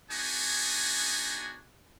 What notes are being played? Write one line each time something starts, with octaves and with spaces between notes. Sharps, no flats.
B3 D4 D#4 F#4 G#4 G#5